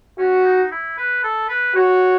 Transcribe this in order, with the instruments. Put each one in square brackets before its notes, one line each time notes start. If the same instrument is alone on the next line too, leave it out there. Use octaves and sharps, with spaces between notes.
[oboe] C#4 [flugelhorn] F#4
[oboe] D#4
E4
B4
A4
B4
[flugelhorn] F#4 [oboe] C#5